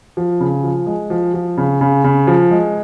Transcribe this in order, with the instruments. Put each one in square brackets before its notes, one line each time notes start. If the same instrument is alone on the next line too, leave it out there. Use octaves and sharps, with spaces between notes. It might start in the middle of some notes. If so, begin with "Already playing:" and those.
[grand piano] F3
C#3
F3
G#3
F3
F3
C#3
C#3
C#3
F3
G#3